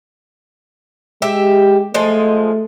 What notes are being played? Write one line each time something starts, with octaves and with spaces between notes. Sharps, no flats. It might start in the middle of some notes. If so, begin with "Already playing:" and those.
G#3 G4 E5
F3 G#3 A3 D#5